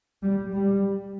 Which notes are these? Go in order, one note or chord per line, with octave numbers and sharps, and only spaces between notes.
G3
G3